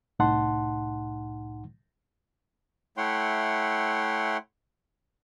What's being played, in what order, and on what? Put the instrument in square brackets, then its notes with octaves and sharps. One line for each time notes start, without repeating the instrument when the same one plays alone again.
[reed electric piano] C2 A2 D#4 F#5 A5 C6
[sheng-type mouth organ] A3 E4 C#5 F#5 G5 C6